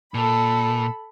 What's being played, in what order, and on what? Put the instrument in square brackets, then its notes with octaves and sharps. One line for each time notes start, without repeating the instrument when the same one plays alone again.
[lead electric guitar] A#2 [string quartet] A4 B5